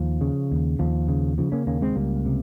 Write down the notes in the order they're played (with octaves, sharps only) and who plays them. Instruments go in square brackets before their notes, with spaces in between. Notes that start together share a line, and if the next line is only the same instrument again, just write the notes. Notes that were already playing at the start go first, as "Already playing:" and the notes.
Already playing: [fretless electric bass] D#2 F3
C#3
D#2
D#2 F3
C#3
C#3 F3
A#3 C#4
D#2 A#3 C#4
G#3 C4
C#2 G3 A#3
C3